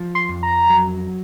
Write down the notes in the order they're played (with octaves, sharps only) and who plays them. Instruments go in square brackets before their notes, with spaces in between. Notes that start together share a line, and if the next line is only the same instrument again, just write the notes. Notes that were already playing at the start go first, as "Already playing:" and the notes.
Already playing: [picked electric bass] F3
[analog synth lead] C6
[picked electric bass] F2
[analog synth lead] A#5
[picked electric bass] F#3